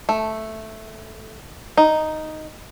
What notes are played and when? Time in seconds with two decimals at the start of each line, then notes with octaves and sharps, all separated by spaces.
0.09 A3
1.77 D#4